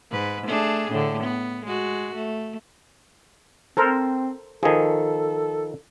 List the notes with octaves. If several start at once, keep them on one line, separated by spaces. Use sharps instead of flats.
G#2 B4
A3 D4 G#4
A2 D3
B3
G#3 F#4
A3
C4 A4 A#4 C5
D#3 F3 G#4 A4